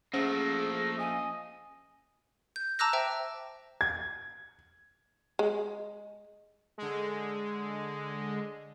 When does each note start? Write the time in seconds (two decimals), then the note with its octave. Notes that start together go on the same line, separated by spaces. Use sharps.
0.13 F3 A3 A#3 C#4 G#4 C5
0.98 D#5 G#5
2.56 G6
2.79 A5 A#5 D6 E6 F#6 A#6
2.93 C5 E5 G5 A5
3.81 G#6
5.39 G#3
6.78 D3 G#3